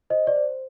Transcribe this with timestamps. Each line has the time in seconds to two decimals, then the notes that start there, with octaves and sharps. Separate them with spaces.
0.10 C5 D#5
0.27 D5
0.36 C5